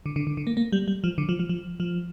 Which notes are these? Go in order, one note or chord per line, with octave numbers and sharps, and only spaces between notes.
D3
D3
D3
D3
A#3
A#3
G3
G3
F3
D3
F3
F3
F3
F3